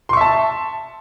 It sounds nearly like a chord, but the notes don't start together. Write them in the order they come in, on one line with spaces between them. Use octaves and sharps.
C6 C#6 E5 A5